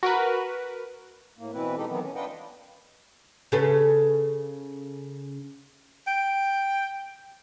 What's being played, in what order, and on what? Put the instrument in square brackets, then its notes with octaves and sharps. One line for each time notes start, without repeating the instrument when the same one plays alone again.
[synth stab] F#4 A#4 B4
[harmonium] A2 A#3
B2 E3 C4 E4 B4
G#3 D#4 G4 A4
D#3 E3 F#3 B3 C4
C#4
D4 F4 B4 D#5 F#5 G5
[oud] C#3 A4 B4
[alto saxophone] G5